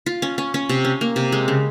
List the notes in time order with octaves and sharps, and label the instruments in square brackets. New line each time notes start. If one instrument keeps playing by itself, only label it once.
[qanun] F4
C#4
C#4
C#4
C3
C#4
A#3
C3
G#3
C#3